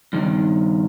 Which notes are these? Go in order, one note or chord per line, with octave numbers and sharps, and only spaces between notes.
G2 D#3